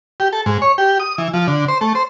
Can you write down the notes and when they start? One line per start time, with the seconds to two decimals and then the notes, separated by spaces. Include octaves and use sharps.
0.20 G4
0.33 A4
0.46 G#2
0.62 C#5
0.78 G4
1.00 D#6
1.18 E3
1.34 F3
1.48 D3
1.68 C5
1.81 A3
1.95 C5